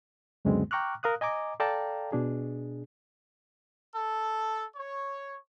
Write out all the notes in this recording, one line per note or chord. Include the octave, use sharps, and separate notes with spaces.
C#2 F#2 D3 G#3 B3 C4
G5 A#5 C#6 D6 F6 F#6
A#4 F5 D#6 F#6
D#5 G#5 A#5 D6
A4 D5 F5 G5 A5 A#5
B2 D4 G#4
A4
C#5